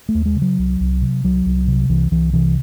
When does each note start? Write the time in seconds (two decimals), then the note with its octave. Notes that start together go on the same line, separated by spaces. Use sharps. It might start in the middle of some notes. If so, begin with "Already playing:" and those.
0.09 A3
0.14 D#2
0.26 G#3
0.36 C#3
0.42 F#3
0.58 C2
0.80 C2
1.02 C3
1.24 C2 F#3
1.46 C2
1.67 C3
1.89 C2 E3
2.11 C2 E3
2.33 C3 E3